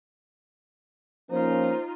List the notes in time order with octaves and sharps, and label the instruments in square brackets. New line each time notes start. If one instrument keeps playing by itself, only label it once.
[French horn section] F3 C#4 [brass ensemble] A#3 [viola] D#4 F4 [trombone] C5